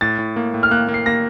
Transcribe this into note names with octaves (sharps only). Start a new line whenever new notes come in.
A2 A6
A2
A#3
A2
F6
A#3 F#6
A#3
C7
A#3 A#6